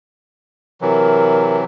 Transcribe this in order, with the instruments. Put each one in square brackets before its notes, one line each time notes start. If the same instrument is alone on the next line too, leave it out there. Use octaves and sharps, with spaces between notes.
[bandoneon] C3 E3 F#3 [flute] A#4